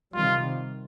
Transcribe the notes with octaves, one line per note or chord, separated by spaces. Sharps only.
C3 D#3 G3 F4